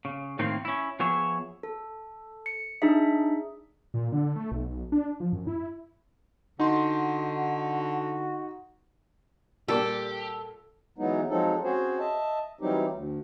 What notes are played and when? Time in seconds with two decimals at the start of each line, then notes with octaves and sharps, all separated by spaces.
0.05 C#3
0.39 A2 D#3 A#3 C4
0.65 C#4 E4
0.99 F3 B3 G#4 C#5 E5
1.63 A4
2.46 C#7
2.82 D4 D#4 G#4 E5
3.94 A#2
4.12 D3
4.36 A3
4.51 B1
4.92 D4
5.20 F3
5.33 F#2
5.47 E4
6.60 D3 D#4 F#4 C6
9.68 A#2 G3 A#3 G4 A4 D6
10.98 E3 F#3 G#3 B3 D#4
11.30 F3 F#3 G#3 C4 D#4 A4
11.63 C4 C#4 F#4 G#4 C5
11.99 D#5 E5 A5
12.61 E3 F#3 G3 C4 D#4 G4
12.92 D2